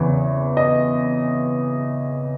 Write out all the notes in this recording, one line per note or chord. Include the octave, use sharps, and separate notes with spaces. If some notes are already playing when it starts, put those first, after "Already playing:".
Already playing: E2 C#3 E3
D#5